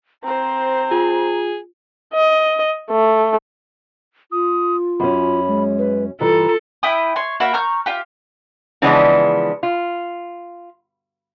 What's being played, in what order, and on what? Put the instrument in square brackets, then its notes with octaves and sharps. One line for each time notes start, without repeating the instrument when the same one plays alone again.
[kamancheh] C4 C5 [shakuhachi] A#5
[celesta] F4 [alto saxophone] G#4
[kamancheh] D#5
A3
[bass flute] F4 [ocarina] D#6
[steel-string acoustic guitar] F#2 C#4 [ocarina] B5
[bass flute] G#3
[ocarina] B4
[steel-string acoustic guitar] G2 E3 [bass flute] F4 [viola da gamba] A4 [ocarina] A#5
[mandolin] E4 G5 D#6
C#5 C6
A#3 F#4 E5 B5
A#5 C#6 F6 G6
F4 G4
[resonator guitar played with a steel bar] C#3 E3 F3 G#3 B3 D4
F4